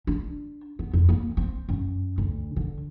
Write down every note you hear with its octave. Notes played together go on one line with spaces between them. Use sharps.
D4
B3
F2
A#3
C4
F#2
D2
D3